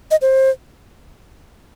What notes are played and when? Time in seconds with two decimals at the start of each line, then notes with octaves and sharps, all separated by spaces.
0.11 D#5
0.21 C5